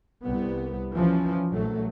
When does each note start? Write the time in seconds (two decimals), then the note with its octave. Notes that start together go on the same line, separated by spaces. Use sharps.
0.23 C2 B3
0.93 E3 F3 C#4
1.49 A#1 F#3 A3